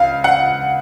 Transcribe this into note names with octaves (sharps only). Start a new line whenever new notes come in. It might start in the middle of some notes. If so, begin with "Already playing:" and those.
Already playing: C#2 F5
F#5